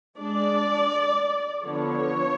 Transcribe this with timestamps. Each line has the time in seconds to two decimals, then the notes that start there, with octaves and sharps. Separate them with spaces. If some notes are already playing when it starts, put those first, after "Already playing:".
0.18 G#3 D4 D5
1.64 D3 F3 B3 D4 C#5